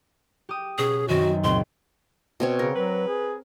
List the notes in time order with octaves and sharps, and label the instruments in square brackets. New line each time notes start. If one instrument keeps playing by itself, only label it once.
[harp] G4 D#6
[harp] B2 C#4 [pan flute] G#4
[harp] F#2 D#3 C4 [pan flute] F#4
[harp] C#2 A#2 C4 [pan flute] C6
[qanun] B2 C4 C#5
[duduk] C#3 [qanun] A#4
[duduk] F#3 [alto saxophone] B4
[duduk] G#4